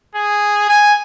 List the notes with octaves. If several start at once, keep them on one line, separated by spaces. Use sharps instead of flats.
G#4
G#5